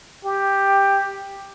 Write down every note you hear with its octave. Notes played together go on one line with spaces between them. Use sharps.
G4